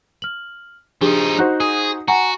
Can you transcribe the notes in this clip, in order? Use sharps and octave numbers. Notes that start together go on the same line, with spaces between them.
F6 F#7
F3 D4 D#4 G4 G#4
D#4 F#4 C5 F#6
G#4 D#6
F#4 F#5 G#5 A#5